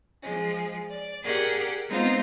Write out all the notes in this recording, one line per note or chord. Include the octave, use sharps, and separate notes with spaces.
F3 G#3
D5
G4 G#4 A#4 D5 F#5
G#3 B3 C4 D#4 F4 C5